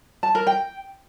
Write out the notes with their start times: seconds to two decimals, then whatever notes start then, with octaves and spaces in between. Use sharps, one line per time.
0.23 A5
0.35 A#4
0.47 G5